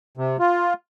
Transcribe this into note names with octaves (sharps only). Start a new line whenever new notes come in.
C3
F4